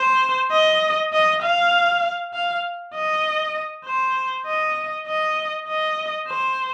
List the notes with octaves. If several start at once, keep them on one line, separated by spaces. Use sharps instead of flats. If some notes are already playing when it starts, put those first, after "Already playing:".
Already playing: C5
D#5
D#5
F5
F5
D#5
C5
D#5
D#5
D#5
C5